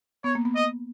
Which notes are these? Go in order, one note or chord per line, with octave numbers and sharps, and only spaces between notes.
B3 C#5
A#3
B3
D#5